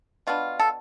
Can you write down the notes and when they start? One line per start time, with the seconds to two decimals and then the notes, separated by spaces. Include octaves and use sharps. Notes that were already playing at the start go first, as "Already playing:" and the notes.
0.27 B2 B3 D4 F4
0.60 A4